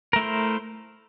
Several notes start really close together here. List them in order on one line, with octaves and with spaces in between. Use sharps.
A#4 A3 E4 C5